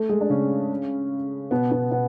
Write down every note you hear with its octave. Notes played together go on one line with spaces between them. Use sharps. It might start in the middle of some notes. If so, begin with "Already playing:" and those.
Already playing: A3 A4
G#3 G#4
D4
C#3 C#4
B2 B3
B2 B3
B2 B3